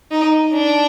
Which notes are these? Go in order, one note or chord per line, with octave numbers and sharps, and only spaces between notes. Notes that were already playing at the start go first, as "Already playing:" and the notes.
D#4
D4